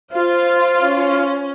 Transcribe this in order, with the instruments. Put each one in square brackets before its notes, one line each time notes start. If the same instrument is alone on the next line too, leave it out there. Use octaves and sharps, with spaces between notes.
[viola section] F4 F5 [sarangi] C5
[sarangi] C#4